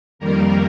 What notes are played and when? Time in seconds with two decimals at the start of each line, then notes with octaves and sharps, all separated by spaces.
0.19 F2 D#3 G3 A#3 A#4